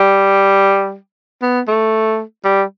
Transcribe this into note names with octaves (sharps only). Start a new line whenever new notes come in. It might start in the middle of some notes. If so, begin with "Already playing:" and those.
Already playing: G3
B3
A3
G3